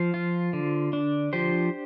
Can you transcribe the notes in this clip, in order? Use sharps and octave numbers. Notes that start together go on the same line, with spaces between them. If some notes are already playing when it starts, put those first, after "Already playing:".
Already playing: F3 C5 F5
F4
D3
D4
F3 G4 C5